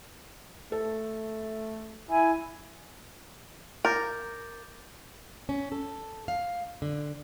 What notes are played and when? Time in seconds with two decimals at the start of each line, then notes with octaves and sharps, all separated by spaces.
0.72 A3 A4
2.10 E4 G#5
3.85 A#4 D6 G6 A6
5.49 C#4
5.72 A4
6.28 F5
6.82 D3